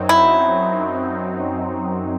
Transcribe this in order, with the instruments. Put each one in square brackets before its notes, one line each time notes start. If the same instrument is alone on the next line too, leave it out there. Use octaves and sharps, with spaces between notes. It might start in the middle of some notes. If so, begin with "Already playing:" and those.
Already playing: [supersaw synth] F#2 F#3 C4 D#4
[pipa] E4